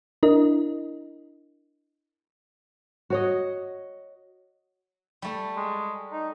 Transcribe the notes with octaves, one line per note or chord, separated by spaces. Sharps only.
D4 E4 A#4 D#5
F#4 C#5 D#5
G3 A3
G#3
D#4